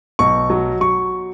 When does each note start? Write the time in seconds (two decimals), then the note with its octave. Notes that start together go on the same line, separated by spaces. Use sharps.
0.19 B1 C#6
0.50 F#3
0.81 F#3 C#6